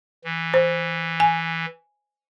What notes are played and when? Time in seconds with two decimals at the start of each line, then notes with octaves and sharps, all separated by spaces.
0.24 E3
0.54 C5
1.20 G#5